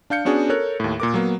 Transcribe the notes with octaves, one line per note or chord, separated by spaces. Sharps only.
D4 F5 G6 C#7
B3 C#4 D4 F#4 G#4
A4 A#4 C#5 F#6
D#2 A2
A#2 A#4 D6
F#3 A#3 B3